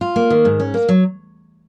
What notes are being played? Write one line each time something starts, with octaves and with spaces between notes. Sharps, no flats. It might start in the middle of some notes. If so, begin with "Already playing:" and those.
F4
A#3
D#3
G#2
C#4
A#3
F#3